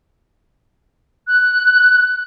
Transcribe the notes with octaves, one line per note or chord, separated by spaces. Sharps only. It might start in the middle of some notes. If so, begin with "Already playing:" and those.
F#6